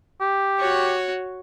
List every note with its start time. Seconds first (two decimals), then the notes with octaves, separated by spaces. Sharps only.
0.21 G4
0.59 F#4 C#5